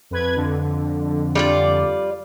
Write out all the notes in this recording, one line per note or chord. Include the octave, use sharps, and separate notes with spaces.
F2 B4 G#6
F2 D3
G3 F4 D5